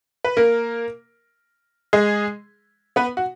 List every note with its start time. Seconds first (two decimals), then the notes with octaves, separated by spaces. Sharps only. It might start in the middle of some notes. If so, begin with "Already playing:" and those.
0.24 B4
0.37 A#3 A#4
1.93 G#3 G#4
2.96 B3 B4
3.17 F#4